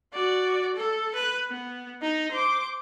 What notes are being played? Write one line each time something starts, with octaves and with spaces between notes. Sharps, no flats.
F#4 D5
A4
B4
B3
D#4
C5 D6